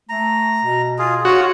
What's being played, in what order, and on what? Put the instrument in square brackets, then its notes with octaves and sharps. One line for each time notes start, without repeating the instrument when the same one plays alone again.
[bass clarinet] A3 [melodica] A#5
[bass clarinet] B2
[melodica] F4 G#4
[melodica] F4 C#5 [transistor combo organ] F#4